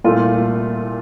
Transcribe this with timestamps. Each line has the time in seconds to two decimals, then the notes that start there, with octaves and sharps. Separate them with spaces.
0.04 C2 A#2 A3 F4